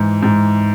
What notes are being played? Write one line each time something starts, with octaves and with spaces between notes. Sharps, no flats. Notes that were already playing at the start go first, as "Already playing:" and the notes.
Already playing: G#2 E3
G#2